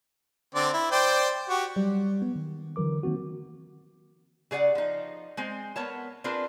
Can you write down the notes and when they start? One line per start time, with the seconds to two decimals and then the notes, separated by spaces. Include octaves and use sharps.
0.55 D3 C4 D5
0.73 E4
0.92 C5 D5 G5
1.49 F#4 G4
1.76 F#3 G3
2.22 B3
2.36 D#3
2.76 D3 E3 F#3 A#4 D6
3.03 D#3 A#3 C4 F#4
4.51 C#3 G#4 D5 F#5
4.75 F3 D#4
5.37 G#3 C4 C5
5.76 B3 A#4 C#5 A5
6.24 C4 D4 F4 G#4 A#4 B4